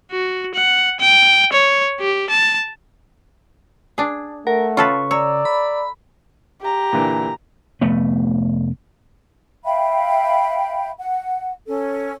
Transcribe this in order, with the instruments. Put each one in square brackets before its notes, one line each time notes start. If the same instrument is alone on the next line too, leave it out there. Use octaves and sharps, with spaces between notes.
[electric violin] F#4
F#5
G5
C#5
G4
A5
[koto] D4 G#4
[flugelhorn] A3 [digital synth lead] A#4 [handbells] F#5
[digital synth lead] C#3 [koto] F4 A4 B4 [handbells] C#6
[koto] C#5 [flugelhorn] D5 [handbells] A#5 E6
[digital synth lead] B5
[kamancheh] G4 A#5
[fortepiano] A#2 D3 E3
[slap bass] F1 A3 B3
[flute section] E5 F5 G5 B5
F#5
C#4 A4